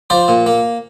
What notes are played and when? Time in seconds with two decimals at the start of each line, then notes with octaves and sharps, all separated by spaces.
0.10 F3 C5 D5
0.28 A#2
0.46 A#3